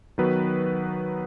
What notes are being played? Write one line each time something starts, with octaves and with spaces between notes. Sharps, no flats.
D#3 F#3 B3 F#4 B4